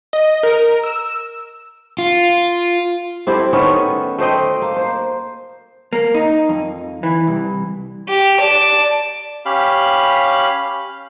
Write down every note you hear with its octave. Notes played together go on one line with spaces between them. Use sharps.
D#5
A#4
E6
F4
C4 E4 G4 A4
D#3 A3 B3 C#4
A3 C5 D#5 G5
A#3
C5
A#3
D#4
F2
E3
C2
G4
D5 A5
C#4 G4 F5 B5